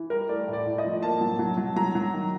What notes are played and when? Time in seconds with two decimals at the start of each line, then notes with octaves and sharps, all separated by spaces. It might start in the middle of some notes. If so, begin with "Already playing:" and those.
Already playing: E3
0.10 G3 A#4
0.29 A3 D5
0.48 A2
0.53 D5
0.66 A2
0.78 D#5
0.84 F3
1.03 A#3 A5
1.21 F#3
1.39 F#3
1.57 F#3
1.76 F#3 A#5
1.95 F#3
2.14 D#3